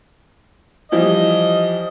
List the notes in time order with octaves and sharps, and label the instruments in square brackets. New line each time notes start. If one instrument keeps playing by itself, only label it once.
[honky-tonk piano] E3 F3 G3 [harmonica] D#5